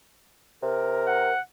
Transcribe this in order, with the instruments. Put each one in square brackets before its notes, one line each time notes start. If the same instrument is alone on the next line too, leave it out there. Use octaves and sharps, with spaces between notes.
[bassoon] C3 [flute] A#4
[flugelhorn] F#5